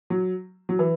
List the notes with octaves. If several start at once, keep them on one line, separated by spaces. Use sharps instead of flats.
F#3
F#3
E3